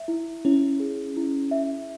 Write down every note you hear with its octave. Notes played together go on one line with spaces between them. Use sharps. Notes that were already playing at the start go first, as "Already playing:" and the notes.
Already playing: E5
E4
C#4 E4
G#4
E4
E5